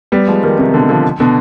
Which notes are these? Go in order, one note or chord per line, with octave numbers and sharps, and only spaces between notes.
G3 B3
F3 G#3
D#3 G3
C3 D#3
B2 D3
D3 F3
B2 D3